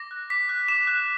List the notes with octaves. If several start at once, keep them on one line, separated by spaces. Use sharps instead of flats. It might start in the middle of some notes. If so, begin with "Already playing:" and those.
Already playing: D6 A#6
F#6
D6 B6
F#6
D6 E7
F#6